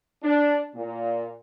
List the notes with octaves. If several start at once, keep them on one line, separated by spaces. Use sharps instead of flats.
D4
A#2